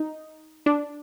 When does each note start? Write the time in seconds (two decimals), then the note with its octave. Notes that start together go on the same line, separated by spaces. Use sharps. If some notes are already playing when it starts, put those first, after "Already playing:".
Already playing: D#4
0.66 D4